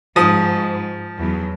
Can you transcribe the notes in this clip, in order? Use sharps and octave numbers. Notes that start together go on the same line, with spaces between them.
G#2 F3 D#6
E2 F#3